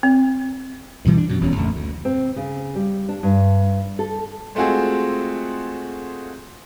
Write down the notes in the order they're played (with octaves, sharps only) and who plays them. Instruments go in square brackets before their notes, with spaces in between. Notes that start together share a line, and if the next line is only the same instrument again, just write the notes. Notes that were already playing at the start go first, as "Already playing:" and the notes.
[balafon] C4
[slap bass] G2 B2 E3 G3
D4
F#2 B2
E1 E2 B2 C#4
A#1 F2 D3 A3
D2
[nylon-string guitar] C4
C#3
G3
D4
G2
A4
[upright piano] G#3 A3 C4 F4 F#4 G#4